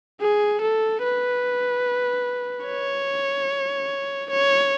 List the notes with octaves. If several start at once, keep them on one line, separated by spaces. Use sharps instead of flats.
G#4
A4
B4
C#5
C#5